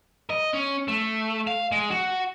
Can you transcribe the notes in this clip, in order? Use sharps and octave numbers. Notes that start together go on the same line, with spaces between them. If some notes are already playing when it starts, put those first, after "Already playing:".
D#5
C#4
A3
F5
G#3
F#4